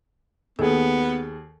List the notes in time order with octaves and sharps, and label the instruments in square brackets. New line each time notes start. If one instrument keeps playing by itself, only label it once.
[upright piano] D#2 G#4 [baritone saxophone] B3 [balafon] A4